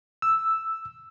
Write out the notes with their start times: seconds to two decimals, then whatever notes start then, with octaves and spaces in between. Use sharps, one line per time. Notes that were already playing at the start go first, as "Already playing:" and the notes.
0.22 E6